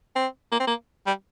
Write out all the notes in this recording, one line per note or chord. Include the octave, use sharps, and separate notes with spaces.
C4
A#3
C4
A#3
G3